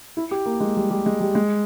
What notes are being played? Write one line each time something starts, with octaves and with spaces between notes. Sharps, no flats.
E4
G4
A#3
G#3
G3
G3
G#3
G3
G#3